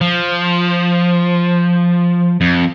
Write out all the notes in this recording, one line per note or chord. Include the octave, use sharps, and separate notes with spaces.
F3
F2